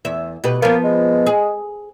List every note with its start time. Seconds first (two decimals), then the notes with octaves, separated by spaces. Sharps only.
0.05 E2 E5
0.44 B2 G4 B4
0.62 F3 A#3 B3
0.84 G#3
1.26 G#4